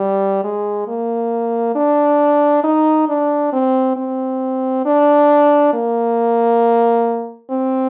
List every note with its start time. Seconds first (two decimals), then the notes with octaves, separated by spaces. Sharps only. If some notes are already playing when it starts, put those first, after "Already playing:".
Already playing: G3
0.44 G#3
0.88 A#3
1.76 D4
2.64 D#4
3.09 D4
3.53 C4
3.97 C4
4.85 D4
5.74 A#3
7.50 C4